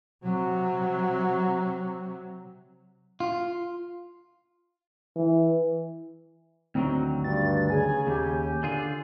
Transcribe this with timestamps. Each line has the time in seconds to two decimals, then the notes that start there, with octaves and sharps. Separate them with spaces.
0.24 C3 F#3
3.20 F4
5.16 E3
6.75 D2 D#3 F#3 C4
7.24 G2 A6
7.70 C#3 G#4 G#5
8.07 D#2 G4
8.63 D3 F4 G#4